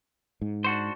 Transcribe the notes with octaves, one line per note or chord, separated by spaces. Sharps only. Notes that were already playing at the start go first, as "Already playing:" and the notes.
G#2
D4 F#4 C5